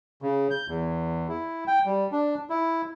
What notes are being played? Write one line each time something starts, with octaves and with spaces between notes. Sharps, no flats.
C#3
G6
E2
E4
G5
G3
D4
E4